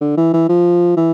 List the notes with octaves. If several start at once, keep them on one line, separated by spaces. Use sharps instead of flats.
D3
E3
E3
F3
E3